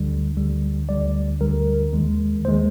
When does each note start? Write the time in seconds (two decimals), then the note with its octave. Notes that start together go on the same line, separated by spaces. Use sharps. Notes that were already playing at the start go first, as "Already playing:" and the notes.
Already playing: D2 D3 G3
0.37 D2 D3 G3
0.89 D2 D3 G3 D5
1.41 D2 D3 G3 A#4
1.93 D#2 D#3 G#3
2.45 D#2 D#3 G#3 C5